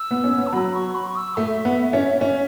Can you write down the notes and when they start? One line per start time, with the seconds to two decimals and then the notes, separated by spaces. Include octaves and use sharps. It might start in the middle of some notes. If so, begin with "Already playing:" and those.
Already playing: E6
0.11 B3
0.24 C#4
0.38 B3
0.47 A5
0.53 F#3 B5
0.74 C#6
0.95 B5
1.07 C#6
1.16 E6
1.36 A3 E5
1.65 B3
1.93 C#4
2.14 C#5
2.21 C#4 E5